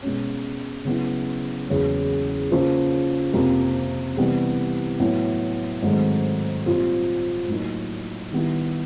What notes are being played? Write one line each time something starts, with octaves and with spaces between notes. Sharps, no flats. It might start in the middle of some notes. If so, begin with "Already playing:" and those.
B2 G#3 C#4
C#3 F#3 B3 E4
E2 C#3 F#3 A#3
C#3 F3 A#3 C#4 F4
F2 C3 F3 A#3
C3 E3 G3 B3
A2 F#3 B3 E4
G#2 D#3 F#3 A3 C4
A#2 G3 C4 F4
A2 F#3 A#3 D#4
D#3 G3 B3 E4